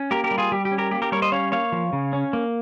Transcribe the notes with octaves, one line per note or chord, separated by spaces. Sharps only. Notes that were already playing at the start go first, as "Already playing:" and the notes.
Already playing: C#4
A#3 G4 A#4
G4 A#4
G3
F4 G#4
G3 G4
G4
C#4
G4 A#4
A#3 G4
G4 A#4
G3 A#4 C#5
C5 D#5
C#4 C#5 F5
A#3 C#5 F5
F3
C#3
C#4
A#3